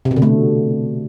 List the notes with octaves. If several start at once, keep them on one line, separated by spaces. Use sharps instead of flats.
C3
B2
D3
A3